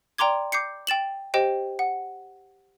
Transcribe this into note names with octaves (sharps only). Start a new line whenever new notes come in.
D5 G5 A#5 C6 D6 G#6
D6 G6 C7 C#7
G5 A6 E7 F#7
G4 C5 D#5 G5
F#5